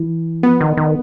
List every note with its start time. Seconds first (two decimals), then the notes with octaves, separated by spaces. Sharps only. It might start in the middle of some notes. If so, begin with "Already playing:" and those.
Already playing: E3
0.43 F3 B3
0.61 D#3
0.77 D#3